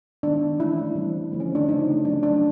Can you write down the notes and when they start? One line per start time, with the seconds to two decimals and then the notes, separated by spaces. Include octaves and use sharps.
0.23 D#3 G#3 B3 D4
0.59 E3 A3 C#4 E4
0.78 E4
0.95 E3 G3 C4
1.32 D3 F3 A3 C4
1.40 C#4
1.55 D4
1.69 C#3 F3 A3 C4 D#4
2.05 F#3 A3 C#4 D4
2.23 D4